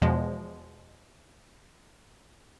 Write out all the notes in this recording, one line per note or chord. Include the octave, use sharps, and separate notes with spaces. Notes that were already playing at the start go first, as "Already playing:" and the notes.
E2 B2 F3 G#3